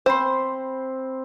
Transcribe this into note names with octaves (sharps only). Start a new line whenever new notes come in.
C4 C5 B5 C6